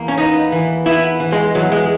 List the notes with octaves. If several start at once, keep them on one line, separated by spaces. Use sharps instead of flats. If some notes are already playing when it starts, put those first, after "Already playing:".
Already playing: E2 A#3
C#4
B3 D#4
E3
B3 E4
E3
G#3
E2 F#3
G#3